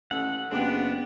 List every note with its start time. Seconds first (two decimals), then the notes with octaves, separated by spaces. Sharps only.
0.11 A1 D#2 A4 F#5
0.51 F#1 G#3 B3 C4 D4 G4